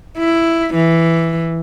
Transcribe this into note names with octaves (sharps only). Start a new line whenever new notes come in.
E4
E3